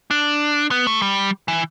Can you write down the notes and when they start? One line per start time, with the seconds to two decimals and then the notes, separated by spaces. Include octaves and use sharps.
0.11 D4
0.71 B3
0.87 A3
1.02 G3
1.48 E3